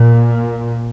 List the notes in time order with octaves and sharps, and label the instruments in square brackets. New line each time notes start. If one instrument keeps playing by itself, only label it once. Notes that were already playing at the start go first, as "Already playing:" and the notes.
Already playing: [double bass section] A#2